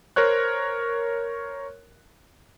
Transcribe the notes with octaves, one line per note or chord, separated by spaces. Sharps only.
A#4 C5 C#5 F#6